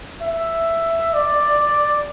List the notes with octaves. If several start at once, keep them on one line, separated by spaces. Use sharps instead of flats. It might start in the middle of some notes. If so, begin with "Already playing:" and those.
E5
D5